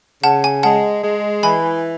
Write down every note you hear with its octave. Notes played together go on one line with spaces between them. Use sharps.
C#3 F#5 A5
G#5
G#3 F#5 A5
G#3
E3 G#5 B5